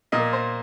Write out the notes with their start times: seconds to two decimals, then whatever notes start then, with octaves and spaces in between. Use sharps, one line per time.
0.12 A#2 A#3 D#5
0.33 C5